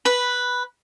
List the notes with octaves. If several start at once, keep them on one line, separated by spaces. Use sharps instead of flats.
B4 B5